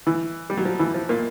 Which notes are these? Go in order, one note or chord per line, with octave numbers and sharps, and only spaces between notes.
E3
G3
F#3
F3
E3
F3
A#2 A#3